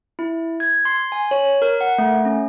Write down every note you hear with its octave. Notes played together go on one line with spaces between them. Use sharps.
E4
G#6
C6
G#5
C#5
A#4
F#5
A3
C#4